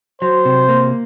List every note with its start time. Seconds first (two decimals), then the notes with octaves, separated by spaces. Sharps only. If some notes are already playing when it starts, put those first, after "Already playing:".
0.22 F#3 C5
0.45 C3
0.69 A#3